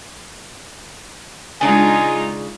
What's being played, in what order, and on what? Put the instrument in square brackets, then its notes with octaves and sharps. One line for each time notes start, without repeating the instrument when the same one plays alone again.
[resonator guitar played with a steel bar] C#3 D4 G#4 [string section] G#3 D#4 F4 [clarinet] G#5